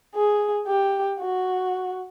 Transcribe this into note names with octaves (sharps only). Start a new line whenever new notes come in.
G#4
G4
F#4